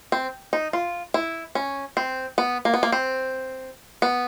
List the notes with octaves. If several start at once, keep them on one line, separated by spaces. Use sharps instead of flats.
C4
D#4
F4
E4
C#4
C4
B3
A#3
B3
A#3
C4
B3